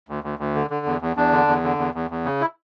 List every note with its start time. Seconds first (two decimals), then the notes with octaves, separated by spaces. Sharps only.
0.09 D2
0.24 D2
0.39 D2
0.55 D3
0.70 D3
0.86 E2
1.01 E2
1.16 E2 D4
1.32 D3
1.48 E2
1.64 D3
1.79 E2
1.94 E2
2.10 E2
2.25 C#3
2.41 E4